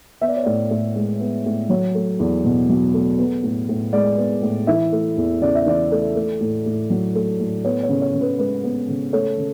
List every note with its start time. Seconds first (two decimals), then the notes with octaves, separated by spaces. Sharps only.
0.21 B3 E5
0.28 D5
0.36 C#5
0.44 A2 D5
0.71 A2
0.96 G#3
1.21 B3
1.46 A2
1.69 F#3 C#5
1.95 A3
2.19 E2
2.45 B2
2.69 F#3
2.94 A3
3.19 B3
3.43 A2
3.69 A2
3.93 G#3 D5
4.18 B3
4.42 A2
4.67 E3 E5
4.92 A3
5.17 E2
5.41 C#3 D5
5.55 E5
5.66 E3 D5
5.91 A3
6.16 A3
6.41 A2
6.66 A2
6.90 F#3
7.15 A3
7.40 A2
7.65 B3 C#5
7.83 C#5
7.89 C#3
8.02 C#5
8.14 C#3
8.21 B4
8.38 G#3 B4
8.64 B3
8.88 C#3
9.13 A3 C#5
9.38 C#3